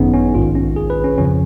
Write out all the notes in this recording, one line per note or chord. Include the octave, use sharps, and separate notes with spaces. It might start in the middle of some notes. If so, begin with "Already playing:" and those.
Already playing: G#1 F#2 D#3 B3 C#4 D#4 G#4
C#4
A#1 G#2 D#3 F4
C#4
G#4
B4
C#4
F2 C#3 F3 C#4